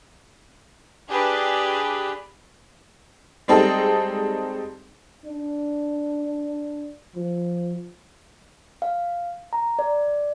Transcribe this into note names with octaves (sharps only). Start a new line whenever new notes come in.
D4 G4 G#4 B4
G3 G#3 C4 D#4 A4
D4
F3
F5
A#5
D5